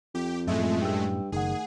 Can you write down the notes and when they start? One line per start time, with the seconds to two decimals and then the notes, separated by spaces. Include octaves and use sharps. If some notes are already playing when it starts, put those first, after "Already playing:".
0.15 F2 G4
0.47 F#2 A2 G#3 A3 F4 E5
0.82 G2 G5 E6
1.32 F#1 D#3 A3 G#4 F#5